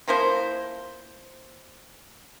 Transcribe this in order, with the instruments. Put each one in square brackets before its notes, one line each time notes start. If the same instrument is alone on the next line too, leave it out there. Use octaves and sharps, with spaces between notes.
[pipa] F3 A#3 E4 C5